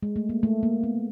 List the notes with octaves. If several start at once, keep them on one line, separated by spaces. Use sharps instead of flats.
G#3
A3
A#3
A3
A#3
B3